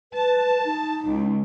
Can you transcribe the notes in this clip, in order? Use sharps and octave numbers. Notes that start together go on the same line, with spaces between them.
B4 A5
D#4
C#2